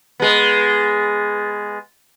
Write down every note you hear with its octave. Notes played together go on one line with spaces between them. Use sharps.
G#3 B3